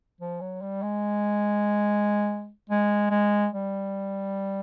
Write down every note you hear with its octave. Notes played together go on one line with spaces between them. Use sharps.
F3
F#3
G3
G#3
G#3
G#3
G3